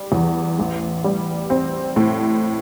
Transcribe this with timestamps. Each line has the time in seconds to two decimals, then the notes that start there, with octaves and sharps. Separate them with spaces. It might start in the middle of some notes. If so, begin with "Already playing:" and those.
Already playing: G3
0.12 E2
0.59 A1
1.04 G3
1.50 C4
1.96 A2